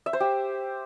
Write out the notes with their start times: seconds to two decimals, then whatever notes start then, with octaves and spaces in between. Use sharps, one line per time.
0.06 E5
0.13 C5
0.20 G4